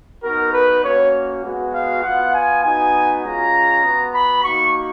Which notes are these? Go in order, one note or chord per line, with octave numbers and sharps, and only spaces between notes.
B3 D#4 F#4 A#4
B4
A#3 C#4 F#4 C#5
G#3 B3 F#4
F5
B3 F4 F#5
G#5
B3 D#4 F#4 G#5
G#3 C#4 F4 A#5
B3 F#4
B5
A#3 D#4 F#4 C#6